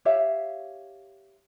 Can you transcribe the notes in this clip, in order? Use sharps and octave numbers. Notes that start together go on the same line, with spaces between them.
G4 C#5 E5 F5